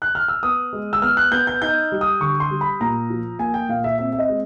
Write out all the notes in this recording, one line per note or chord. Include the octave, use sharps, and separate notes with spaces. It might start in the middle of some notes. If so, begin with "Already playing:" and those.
F#6
F6
E6
B3 D#6
G#3
E6
B3 F6
F#6
B3 G6
G6
D#4 G6
G3
D#6
D3 C#6
C6
G3
B5
A#2 A#5
F3
A#3 G#5
G5
A#2 F5
E5
C4 E5
E5
D#5
G#3